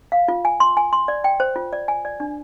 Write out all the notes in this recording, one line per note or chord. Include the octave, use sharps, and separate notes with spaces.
F5
F4
G#5
C6
G#5
C6
D5
G5
C5
F4
D5
G#5
D5
D4